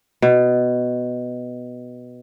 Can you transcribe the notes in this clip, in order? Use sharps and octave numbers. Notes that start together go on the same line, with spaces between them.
B2